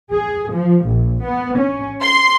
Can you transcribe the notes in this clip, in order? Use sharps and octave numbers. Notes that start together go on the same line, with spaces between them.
G#4
F3
A#1
B3
C#4
C6